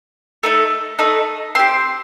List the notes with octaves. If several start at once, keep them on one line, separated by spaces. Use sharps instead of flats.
A3 D#4 A4
A3 D#4 A4
C4 G4 C6